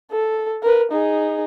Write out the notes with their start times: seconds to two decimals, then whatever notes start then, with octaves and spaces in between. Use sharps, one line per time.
0.12 A4
0.63 A#4 B4
0.91 D#4 G#4